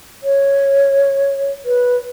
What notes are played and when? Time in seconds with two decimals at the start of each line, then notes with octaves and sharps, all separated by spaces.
0.23 C#5
1.65 B4